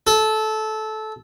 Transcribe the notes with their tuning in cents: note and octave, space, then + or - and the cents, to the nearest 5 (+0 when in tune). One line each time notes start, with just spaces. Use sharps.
A4 -20